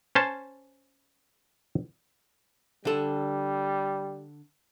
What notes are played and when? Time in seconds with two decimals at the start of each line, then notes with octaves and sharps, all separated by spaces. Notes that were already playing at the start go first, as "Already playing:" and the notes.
0.15 C#4 C5 A5
2.85 D3 G3 A4